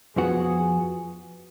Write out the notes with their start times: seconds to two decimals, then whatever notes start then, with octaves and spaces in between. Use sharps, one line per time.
0.16 F2 F3 B3 F#4 G#4